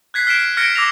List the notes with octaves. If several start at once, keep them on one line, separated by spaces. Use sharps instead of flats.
F#6 G#6 B6 C7
F6 B6 D7 E7
F6 G#6 A#6 C#7 D7
D6 E6 A#6 F7